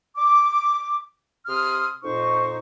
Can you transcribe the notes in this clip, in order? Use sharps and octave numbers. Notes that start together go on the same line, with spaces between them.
D6
C3 C6 D#6 F6
F2 A#2 D#4 C5 C#6